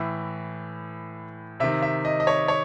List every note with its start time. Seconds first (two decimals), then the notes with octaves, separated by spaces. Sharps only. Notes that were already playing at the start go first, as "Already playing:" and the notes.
Already playing: A2 E3 E5
1.60 C3 D#3 E5
1.82 E5
2.05 D#5
2.20 D#5
2.27 C#5
2.48 C#5